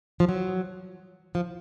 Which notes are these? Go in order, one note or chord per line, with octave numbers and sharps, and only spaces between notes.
F3
F#3
F3